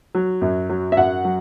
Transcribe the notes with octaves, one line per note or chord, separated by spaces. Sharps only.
F#3
F#2
F#3
E5
F#2 F#5
F#3